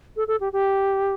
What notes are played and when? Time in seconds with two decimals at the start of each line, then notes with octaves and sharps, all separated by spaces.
0.16 A4
0.28 A4
0.40 G4
0.53 G4